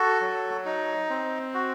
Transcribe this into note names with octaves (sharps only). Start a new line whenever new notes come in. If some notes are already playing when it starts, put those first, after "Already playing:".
Already playing: F#4 A4
F#3
D#4
C4
F#4